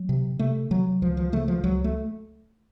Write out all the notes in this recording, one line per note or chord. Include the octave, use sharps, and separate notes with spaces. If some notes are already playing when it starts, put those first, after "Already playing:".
Already playing: F#3
C3
C3 A3
C3 F#3
C#2 F3
F3
C#3 A3
F3
C#2 F#3
A3